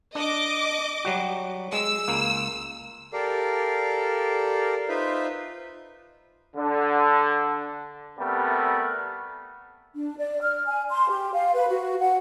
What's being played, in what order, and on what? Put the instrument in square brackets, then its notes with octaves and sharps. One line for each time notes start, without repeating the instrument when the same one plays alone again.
[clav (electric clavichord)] D4 [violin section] D#5 D6
[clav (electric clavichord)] F#3 G3 F#4
[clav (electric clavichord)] G#3 [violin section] E6
[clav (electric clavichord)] C#2 A#3
[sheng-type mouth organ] G4 A4 A#4 D5 F5
D#4 F4 B4 C5 E5
[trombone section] D3
C3 G3 A3 B3 A#4
[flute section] D4
D5
F6
G#5
C6
G4
F5
B4
F#4
F#5